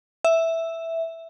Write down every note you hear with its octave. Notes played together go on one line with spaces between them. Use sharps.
E5